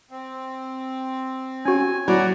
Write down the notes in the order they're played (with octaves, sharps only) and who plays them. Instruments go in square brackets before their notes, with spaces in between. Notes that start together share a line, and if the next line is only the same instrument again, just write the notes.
[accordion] C4
[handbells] C#4 F#4 [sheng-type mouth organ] G#5
[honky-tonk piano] F#3 [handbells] E4 [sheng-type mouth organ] F#4 D5 [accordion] A#5